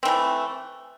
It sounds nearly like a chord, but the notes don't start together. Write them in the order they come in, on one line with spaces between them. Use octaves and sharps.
C4 E3 A3